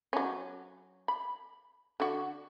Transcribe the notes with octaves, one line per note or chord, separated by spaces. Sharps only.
F#3 C#4
B5
D3 F#4